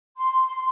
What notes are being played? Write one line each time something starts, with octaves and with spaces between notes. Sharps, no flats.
C6